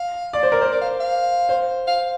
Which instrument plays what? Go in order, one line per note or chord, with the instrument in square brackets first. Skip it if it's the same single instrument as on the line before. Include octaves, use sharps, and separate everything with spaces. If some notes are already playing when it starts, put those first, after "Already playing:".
Already playing: [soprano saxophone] F5
[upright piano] D5
C5
A#4
C5
[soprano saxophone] D5
F5
F5
[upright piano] C5
[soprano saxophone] F5